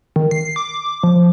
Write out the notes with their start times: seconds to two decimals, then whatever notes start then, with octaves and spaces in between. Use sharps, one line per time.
0.16 D#3
0.31 C7
0.56 D6
1.03 F3